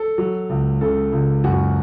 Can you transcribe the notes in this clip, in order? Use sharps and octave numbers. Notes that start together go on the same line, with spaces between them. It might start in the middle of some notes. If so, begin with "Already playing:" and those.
Already playing: A4
F#3
C#2
C#3 A4
C#2
F#2 F#4